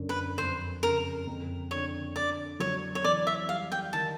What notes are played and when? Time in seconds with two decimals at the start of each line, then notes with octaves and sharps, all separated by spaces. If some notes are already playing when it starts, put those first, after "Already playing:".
Already playing: F#2 D3
0.09 B4
0.38 F2 C5
0.83 C#3 A#4
1.27 F2
1.71 D3 C#5
2.16 D3 D5
2.60 F#3 C#5
2.95 C#5
3.04 E3 D5
3.27 E5
3.49 G3 F5
3.72 G5
3.93 D#3 A5